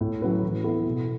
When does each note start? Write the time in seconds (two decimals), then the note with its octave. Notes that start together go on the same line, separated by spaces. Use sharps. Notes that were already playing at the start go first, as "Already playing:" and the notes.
0.01 A2
0.22 F#3 C#4 E4 B4
0.43 E3
0.64 B3 E4 A4
0.85 B2